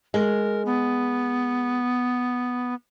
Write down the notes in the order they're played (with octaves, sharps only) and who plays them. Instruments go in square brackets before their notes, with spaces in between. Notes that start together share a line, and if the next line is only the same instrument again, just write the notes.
[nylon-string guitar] G#3 [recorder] A#4
[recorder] B3